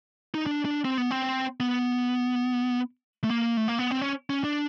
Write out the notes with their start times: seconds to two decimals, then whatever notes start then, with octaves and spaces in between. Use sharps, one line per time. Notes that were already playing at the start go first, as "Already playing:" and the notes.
0.34 D#4
0.46 D4
0.65 D4
0.85 C4
0.98 B3
1.11 C4
1.60 B3
3.24 A3
3.30 A#3
3.57 A3
3.68 A#3
3.79 B3
3.91 C4
4.01 C#4
4.30 C#4
4.44 D4